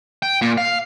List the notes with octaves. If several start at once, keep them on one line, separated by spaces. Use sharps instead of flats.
G5
A#2
F5